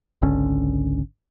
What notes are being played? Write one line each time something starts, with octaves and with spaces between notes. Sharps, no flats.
G#1 C#2 D3 C#4